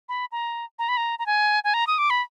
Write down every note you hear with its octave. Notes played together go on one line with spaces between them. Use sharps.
B5
A#5
A#5
B5
A#5
A#5
G#5
G#5
A#5
D#6
D6
B5